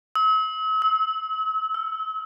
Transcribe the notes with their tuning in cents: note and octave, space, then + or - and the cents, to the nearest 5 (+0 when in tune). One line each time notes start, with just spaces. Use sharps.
E6 -45
E6 -25
E6 +25